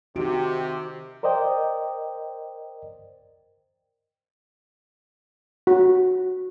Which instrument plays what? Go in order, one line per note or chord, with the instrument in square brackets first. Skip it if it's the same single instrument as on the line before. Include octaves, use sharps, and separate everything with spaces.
[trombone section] C3 [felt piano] D#3 D7 [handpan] F#4 [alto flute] G4
[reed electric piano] A#4 C5 D5 D#5 G5
[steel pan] F#4